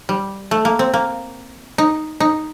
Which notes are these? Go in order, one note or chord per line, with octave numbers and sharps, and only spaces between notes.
G3
A3
A#3
C4
A#3
D#4
D#4